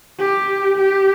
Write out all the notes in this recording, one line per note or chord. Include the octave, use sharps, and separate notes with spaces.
G4
G4